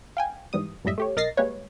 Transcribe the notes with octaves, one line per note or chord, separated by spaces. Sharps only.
F5 G5 G#5
G#2 E3 G3 D#6
F#2 A2 G3 D#5 E5
A3 G4 C#5
B1 A#4 D#5 A6 A#6 C7
G3 G#3 A#3 B4 C#5